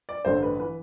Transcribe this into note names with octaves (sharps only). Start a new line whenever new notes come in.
D5
A1 G2 D3 A3 C5
B4
E3 B4